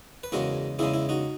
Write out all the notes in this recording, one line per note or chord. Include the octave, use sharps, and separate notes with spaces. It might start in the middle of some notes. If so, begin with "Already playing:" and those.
B4
E2 C#3 G#3 F#4 A#4
E2 C#3 G#3 E4 G#4
E4
D#4 F#4